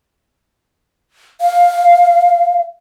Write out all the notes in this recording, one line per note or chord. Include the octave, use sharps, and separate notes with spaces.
F5